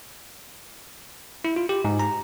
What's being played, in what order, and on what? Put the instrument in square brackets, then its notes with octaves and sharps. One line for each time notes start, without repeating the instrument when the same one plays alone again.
[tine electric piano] E4
F4
G4
G#2
A#5